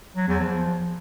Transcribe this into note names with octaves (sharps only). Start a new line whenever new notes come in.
F#3
E2
F3